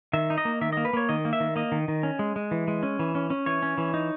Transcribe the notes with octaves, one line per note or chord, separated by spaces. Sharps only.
D#3 E5
D#4
D#5
A#3
D#3 E5
A#3 D#5
B4
A#3 C#5
D#3 D#5
A#3
E5
D#3
A#3 D#5
D#3
D#3
C#4
G#3
G#3
E3
G#3
C#4
E3
C#4
C#4
E3 C#5
C#4
E3
D#4